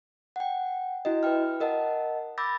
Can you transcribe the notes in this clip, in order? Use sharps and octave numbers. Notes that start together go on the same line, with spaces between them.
F#5 G5
E4 F#4 D#5
B4 E5 G5 F6
A#4 D#5 F#5 A5
B5 D6 E6 G6 A6 A#6